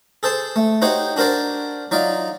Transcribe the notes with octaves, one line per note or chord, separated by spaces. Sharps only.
G#4 A4 C5 A5
A3
D#4 F#4 G4 C5 C#5 F#5
D4 F#4 A#4 C5 D5
F#3 D#4 F4 D5